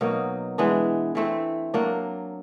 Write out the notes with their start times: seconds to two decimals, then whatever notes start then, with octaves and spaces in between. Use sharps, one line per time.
0.01 B2 F#3 A#3 D#4
0.58 E3 G#3 B3 D4
1.15 E3 A3 C4
1.74 F#3 A#3 D4